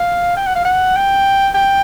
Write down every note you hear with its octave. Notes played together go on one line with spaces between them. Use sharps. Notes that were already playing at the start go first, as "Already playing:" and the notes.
Already playing: F5
G5
F#5
F5
F#5
G5
G5